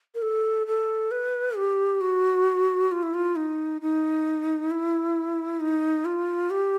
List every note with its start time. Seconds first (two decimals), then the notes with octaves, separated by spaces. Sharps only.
0.15 A#4
0.22 A4
0.67 A4
1.11 B4
1.57 G4
2.01 F#4
2.92 F4
3.03 E4
3.14 F4
3.36 D#4
3.82 D#4
4.71 E4
5.60 D#4
6.05 F4
6.50 G4